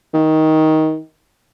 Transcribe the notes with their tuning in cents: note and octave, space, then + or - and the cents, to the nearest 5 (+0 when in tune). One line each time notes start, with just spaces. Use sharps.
D#3 +15